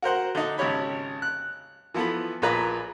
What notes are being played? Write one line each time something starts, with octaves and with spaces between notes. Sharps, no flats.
F#4 A#4 C5 F#5
D3 D#4
G#1 C#3 G4 C#5 B5
F#6
E3 F3 B3 A4 B5
A#1 A#2 A#3 G#4 B4 A#5